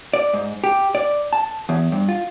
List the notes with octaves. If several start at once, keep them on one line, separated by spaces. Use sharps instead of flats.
D5
G#2
G4
D5
A5
E2
G2
F4